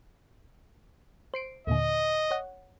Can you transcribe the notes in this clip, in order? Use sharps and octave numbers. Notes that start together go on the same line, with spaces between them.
C5 C7 D7
D#2 A#2 D3 D#5
C#5 F#5